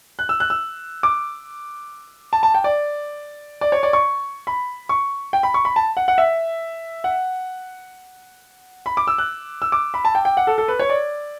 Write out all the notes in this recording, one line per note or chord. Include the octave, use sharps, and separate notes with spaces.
F#6
E6
F#6
E6
D6
A5
A5
G5
D5
D5
C#5
D5
C#6
B5
C#6
G5
B5
C#6
B5
A5
F#5
F#5
E5
F#5
B5
D6
E6
F#6
E6
D6
B5
A5
G5
G5
F#5
A4
A4
B4
C#5
D5